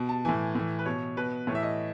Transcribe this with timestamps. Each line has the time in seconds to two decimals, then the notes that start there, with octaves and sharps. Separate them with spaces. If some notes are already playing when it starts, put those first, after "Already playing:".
Already playing: B2
0.09 A5
0.25 A2 E3 G#5
0.55 A2 E3
0.79 B4
0.85 B2 C#5
1.17 B2 B4
1.47 A2 C#5
1.52 E3 E5
1.63 D#5